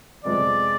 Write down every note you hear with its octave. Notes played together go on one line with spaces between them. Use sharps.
F2 C3 F3 G#3 B3 D5